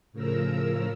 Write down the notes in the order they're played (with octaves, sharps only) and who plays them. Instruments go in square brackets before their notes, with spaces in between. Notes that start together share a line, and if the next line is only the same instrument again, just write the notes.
[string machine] A2 C#3 F3 A#4 A#5 E6